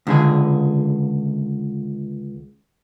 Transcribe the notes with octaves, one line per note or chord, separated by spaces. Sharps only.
C#2 D3 G#4